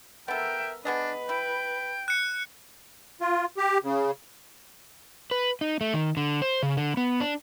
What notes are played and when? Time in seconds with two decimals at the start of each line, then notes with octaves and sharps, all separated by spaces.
0.28 B3 A4 A#4 E5 G5
0.85 B3 D4 G#4 B4 D#5
1.29 E4 G5
2.08 F#6 C#7
3.21 F4
3.57 G4
3.84 C#3
5.31 B4
5.61 D#4
5.81 A3
5.94 D#3
6.17 D3
6.42 C5
6.63 C#3
6.77 D3
6.97 B3
7.20 D4